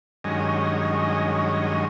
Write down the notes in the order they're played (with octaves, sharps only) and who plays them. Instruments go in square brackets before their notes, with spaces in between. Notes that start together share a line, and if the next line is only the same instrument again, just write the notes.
[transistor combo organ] G2 D#3 F#3 G#3 C#4 D#5